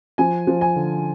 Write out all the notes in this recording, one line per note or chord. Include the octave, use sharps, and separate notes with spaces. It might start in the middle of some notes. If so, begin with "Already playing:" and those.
F3 G#5
F3
G#5
D3